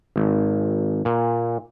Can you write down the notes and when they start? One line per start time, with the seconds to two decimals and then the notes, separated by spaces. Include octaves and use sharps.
0.16 G#1
1.05 A#2